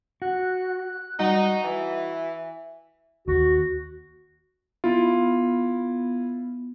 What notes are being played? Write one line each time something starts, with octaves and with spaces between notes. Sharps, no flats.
F#4 F#6
G3 D#4 F#4
E3 E5
D#2 F#4
B3 E4 F4